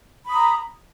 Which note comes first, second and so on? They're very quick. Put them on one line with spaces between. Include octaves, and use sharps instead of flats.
B5 D#6 A#5